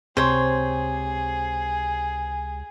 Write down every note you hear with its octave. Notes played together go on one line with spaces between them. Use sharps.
C#2 C3 G#4 C5 C#5